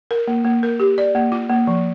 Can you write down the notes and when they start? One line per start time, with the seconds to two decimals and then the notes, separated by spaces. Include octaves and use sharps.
0.11 A#4
0.27 A#3
0.44 A#3
0.63 A#4
0.80 G4
0.98 D5
1.15 A#3
1.32 F4
1.49 A#3
1.67 F3